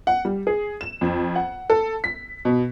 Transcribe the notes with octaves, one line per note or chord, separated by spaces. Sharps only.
F#5
G3
G#4
E7
F2
F#5
A4
B6
B2